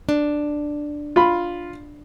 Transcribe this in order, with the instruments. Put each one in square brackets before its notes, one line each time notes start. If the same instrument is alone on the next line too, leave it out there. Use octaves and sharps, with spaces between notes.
[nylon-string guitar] D4
[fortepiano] F4 B5